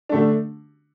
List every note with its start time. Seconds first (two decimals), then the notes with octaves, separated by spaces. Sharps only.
0.09 D3 A3 D4